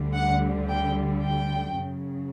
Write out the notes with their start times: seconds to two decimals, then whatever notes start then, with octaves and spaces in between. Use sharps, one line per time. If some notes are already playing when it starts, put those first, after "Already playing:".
Already playing: D2 D3 G3
0.14 F#5
0.70 G5
1.25 G5
1.80 F#2 C#3 F#3